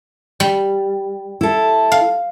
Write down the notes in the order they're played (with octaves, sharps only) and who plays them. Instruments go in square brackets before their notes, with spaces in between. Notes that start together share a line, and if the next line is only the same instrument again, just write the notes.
[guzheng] G3
[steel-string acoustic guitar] E4 A4
[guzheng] F5